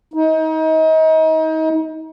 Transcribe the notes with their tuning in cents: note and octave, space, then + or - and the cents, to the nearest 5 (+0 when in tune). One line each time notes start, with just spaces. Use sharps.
D#4 +30